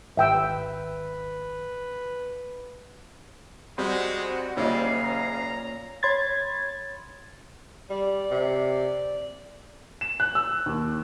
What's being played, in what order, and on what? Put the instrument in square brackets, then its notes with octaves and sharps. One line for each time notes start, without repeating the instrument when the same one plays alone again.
[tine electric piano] G#1 [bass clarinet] B4 [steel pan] E5 G5 E6
[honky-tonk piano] G3 C4 C5 [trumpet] G#3 [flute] F#4
[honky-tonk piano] F#1 D#5 [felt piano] A#2 C#5 [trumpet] G3 [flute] F5
[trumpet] A#5
[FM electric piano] C#5 B5 C6 G#6 A6
[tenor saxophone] G3 [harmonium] D5
[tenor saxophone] C3
[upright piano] E7
F#6
E6
D#2